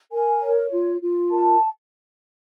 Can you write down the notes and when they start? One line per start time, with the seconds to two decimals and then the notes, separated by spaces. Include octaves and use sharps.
0.12 A#4 G#5
0.41 C#5
0.72 F4
1.02 F4
1.31 A#4 A5